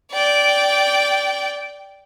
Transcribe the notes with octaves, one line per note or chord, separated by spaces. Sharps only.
D5 G5